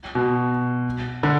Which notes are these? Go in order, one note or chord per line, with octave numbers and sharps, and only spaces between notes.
B2
D3